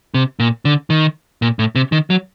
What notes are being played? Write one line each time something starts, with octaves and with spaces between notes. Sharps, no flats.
C3
A#2
D3
D#3
A#2
A2
C3
D#3
F#3